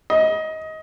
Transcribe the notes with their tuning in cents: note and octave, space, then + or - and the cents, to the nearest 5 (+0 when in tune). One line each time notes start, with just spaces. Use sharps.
D#5 +20